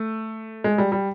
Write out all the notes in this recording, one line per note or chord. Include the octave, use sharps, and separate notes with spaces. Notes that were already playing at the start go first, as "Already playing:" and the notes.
Already playing: A3
G#3
G3
G3